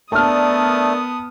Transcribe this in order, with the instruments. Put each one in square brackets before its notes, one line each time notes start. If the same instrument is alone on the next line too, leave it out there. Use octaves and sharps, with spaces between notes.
[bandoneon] A3 [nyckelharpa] B3 D#6 [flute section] D4 A#4 D5 [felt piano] A5 F6